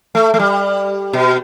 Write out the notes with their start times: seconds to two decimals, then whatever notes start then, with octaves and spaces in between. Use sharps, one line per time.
0.15 A3
0.34 A3
0.39 G3
1.13 B2